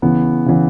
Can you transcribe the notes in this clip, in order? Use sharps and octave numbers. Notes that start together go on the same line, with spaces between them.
C#3 E3 B3
C#3 E3 B3